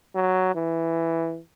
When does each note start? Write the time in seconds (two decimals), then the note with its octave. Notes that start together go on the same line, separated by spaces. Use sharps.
0.15 F#3
0.55 E3